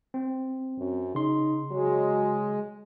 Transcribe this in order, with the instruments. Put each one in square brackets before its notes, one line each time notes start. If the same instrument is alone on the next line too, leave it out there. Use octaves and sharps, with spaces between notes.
[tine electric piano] C4
[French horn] F#2
[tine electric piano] C#3 C6 [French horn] D#4
[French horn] F#3 [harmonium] G#3